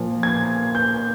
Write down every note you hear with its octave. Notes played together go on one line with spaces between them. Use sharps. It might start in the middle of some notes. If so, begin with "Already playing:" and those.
Already playing: A#2 F3 A#3
G#6
G6